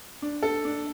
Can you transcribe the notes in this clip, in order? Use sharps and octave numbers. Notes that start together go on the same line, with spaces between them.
D4
A4
D4